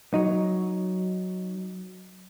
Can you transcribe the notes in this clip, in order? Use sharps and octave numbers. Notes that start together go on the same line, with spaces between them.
F#3 D#4